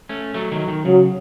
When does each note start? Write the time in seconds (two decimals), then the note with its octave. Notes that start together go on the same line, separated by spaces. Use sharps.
0.09 A3 C#4
0.34 F#3 A3
0.51 D#3 F#3
0.68 D#3
0.85 C#3 F#3